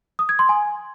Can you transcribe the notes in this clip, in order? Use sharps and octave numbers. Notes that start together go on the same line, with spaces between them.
D#6
G#6
C6
G#5